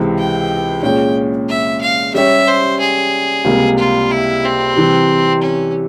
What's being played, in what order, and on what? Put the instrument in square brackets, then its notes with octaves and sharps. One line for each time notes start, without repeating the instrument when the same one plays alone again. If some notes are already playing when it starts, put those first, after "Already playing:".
Already playing: [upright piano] C#2 C3 E3 G#3 C4
[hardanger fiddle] G5
[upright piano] A#2 G#3 C#4 [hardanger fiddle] G5
[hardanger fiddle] E5
F5
[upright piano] G3 C#4 G4 C#5 [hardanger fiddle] E5
[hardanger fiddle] C5
G#4
[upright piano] C#2 C3 G3 A#3
[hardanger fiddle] F4
E4
C4
[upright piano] C3 E3 G3
[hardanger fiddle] C#4